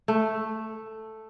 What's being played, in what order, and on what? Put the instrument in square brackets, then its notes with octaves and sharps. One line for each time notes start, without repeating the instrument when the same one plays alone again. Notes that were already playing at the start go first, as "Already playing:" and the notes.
[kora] A3